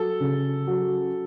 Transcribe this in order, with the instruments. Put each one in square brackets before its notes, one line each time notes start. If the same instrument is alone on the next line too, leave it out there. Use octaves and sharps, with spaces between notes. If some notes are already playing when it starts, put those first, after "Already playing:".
Already playing: [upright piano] F#3 [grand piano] A4
[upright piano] C#3
F#3